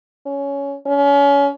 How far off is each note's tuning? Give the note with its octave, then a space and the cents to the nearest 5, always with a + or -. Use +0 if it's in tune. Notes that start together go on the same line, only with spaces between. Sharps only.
C#4 +15
C#4 +30